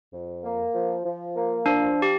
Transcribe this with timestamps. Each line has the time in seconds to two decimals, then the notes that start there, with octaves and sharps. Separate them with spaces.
0.13 F2
0.44 A#3
0.75 F3
1.05 F3
1.36 A#3
1.66 F3 D4
2.02 G4